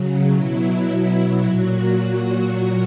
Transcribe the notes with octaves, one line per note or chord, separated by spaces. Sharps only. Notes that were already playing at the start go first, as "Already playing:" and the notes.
Already playing: C#3 F#3
B2 F#3 E4
B2 F#3
A#2 F#3 F#4